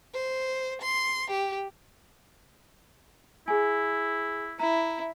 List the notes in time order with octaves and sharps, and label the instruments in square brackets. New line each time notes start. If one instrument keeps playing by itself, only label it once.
[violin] C5
C6
G4
[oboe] E4 [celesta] G#4 G#5
[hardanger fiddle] E4 [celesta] A#5